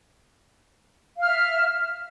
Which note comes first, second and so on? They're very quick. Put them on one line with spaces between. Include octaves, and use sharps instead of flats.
F5 F6 E5